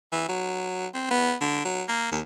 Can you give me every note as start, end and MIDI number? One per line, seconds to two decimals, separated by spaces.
0.12 0.26 52
0.29 0.87 54
0.94 1.07 60
1.11 1.34 59
1.41 1.63 50
1.65 1.83 54
1.88 2.11 58
2.12 2.20 39